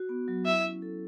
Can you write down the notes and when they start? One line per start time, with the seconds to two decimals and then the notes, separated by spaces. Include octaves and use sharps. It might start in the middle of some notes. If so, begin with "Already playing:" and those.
Already playing: F#4
0.09 B3
0.28 F#3
0.46 E4 E5
0.64 C#4
0.82 A4